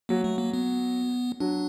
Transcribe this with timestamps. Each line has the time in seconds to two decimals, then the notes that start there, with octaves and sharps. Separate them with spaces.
0.09 F#3 A#3
0.24 A3
0.38 A#3
0.53 B3
1.40 F#3 D4